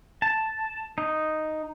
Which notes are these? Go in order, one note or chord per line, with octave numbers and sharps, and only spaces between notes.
A5
D#4